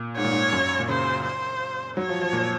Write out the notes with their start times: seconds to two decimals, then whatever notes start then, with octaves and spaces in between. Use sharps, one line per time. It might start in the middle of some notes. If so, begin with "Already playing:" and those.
Already playing: A#2
0.16 G#2 C#5
0.25 A#2
0.32 G#2
0.53 F#2
0.80 A#2
0.88 C#3 C5
1.25 C5
1.97 F#3 C#5
2.09 F3
2.21 F3
2.33 A#2